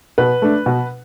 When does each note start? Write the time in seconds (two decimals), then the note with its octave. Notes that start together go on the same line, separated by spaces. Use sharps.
0.18 B2 B4
0.42 A3 D4
0.66 B2